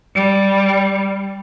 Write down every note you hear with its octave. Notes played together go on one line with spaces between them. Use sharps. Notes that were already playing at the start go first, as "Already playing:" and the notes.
G3